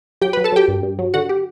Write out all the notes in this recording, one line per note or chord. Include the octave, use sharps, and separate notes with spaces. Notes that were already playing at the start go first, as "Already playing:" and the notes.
F#3 G4 G5
B4 B5
F#3
A4 A5
F#3 G4 G5
G2
G2
F#3
D3 F#4 F#5
G4